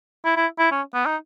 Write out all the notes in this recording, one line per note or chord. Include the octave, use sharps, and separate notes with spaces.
E4
E4
E4
C#4
B3
D#4